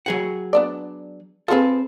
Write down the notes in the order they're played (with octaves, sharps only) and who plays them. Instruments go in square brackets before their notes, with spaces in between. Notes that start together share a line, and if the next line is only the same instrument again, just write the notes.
[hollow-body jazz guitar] F#3 G#4 F#5
[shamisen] B3 D4 D5
[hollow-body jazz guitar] C4 A4 [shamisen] F4 G#4 B4